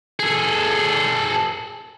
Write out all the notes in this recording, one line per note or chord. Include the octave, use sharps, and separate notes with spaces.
G#4 A4